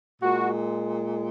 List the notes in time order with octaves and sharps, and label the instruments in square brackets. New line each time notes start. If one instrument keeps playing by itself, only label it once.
[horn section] A#2 G#3 F#4